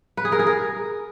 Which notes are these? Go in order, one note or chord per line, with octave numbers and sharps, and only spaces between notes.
B4
G#4
A#4
G#4
A#4